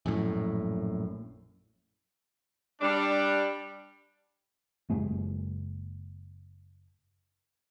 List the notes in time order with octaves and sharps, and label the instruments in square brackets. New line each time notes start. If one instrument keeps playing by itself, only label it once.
[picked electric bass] A#1 F#2 A2
[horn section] G3 D4
[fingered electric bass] F#1 F#2 G#3 A#3